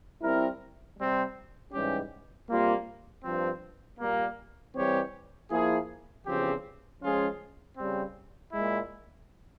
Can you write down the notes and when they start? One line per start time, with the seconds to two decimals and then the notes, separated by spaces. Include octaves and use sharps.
0.20 G3 C4 E4 A#4
0.96 C3 G3 C4
1.72 G#2 E3 G3 C#4 G4
2.47 C3 G3 A#3 F4
3.23 G2 F3 C4
3.99 A#2 G3 A#3
4.75 E3 G3 C4 G4 C#5
5.50 F3 A#3 E4 G#4
6.26 E2 C#3 F3 C4 G4
7.01 F3 G#3 C#4 F4 G#4
7.77 C#3 G3 C4
8.53 A#2 G#3 E4